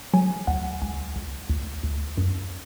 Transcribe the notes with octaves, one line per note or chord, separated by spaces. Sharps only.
F#3 G#5
D2 F#5
C#2 G#5
C#2
D2
D2
F#2